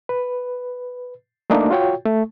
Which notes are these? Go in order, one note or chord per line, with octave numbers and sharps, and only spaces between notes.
B4
A3 A#3 D4 D#4
F4 F#4 C#5 G5
A3